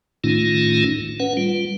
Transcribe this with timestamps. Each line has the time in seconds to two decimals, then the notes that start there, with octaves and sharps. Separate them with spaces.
0.24 A2 D#3 A3 C#4 D#4 F4
1.20 C#4 B4 F#5
1.37 G3 F4